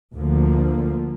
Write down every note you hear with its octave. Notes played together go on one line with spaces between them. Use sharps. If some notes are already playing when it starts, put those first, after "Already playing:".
D2 D3 F3 A#3